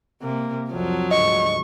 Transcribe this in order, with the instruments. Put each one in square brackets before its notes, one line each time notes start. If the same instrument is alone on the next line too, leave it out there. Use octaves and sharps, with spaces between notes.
[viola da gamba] C3 [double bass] A#3
[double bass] C2 F2 [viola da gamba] F3 F#3
[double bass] D2 G#2 [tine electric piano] D#5 [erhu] C#6